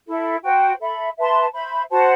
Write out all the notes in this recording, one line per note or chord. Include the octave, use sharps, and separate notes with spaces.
E4 A4 E5
F#4 C5 G5
A4 E5 B5
B4 E5 A5 C6
C5 E5 B5
F#4 C5 F#5 A5